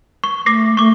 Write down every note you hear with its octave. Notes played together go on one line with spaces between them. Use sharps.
C#6
A3 D6 A#6 C7
A3 C#6 D6